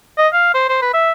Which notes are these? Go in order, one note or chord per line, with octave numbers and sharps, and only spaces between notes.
D#5
F5
C5
C5
B4
E5